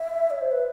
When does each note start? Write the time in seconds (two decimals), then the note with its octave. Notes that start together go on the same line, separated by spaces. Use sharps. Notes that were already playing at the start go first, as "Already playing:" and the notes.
Already playing: E5
0.30 C#5
0.41 C5
0.51 B4